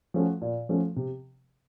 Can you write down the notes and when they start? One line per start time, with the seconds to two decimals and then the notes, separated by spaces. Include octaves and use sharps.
0.14 F3 A3 C#4 F#4
0.41 A#2
0.69 F3 A3 C#4 F#4
0.96 C3